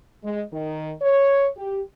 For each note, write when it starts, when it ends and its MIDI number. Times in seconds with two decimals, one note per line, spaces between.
0.24 0.42 56
0.53 0.93 51
1.02 1.49 73
1.57 1.81 67